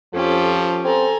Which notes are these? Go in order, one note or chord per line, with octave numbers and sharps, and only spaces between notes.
F2 F3 C#4 G4 A4
C4 A4 G#5 A#5